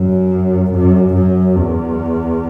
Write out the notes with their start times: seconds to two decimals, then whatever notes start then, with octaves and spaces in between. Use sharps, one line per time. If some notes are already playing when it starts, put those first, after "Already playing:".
Already playing: F#2
0.73 F#2
1.14 F#2
1.56 E2